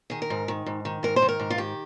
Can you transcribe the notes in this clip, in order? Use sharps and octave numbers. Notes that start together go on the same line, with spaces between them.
D#3 G#4
A#4
G#2
D#3
G#2
D#3
G#2 A#4
C5
D#3
A#4
G#2
F4
D#3 G4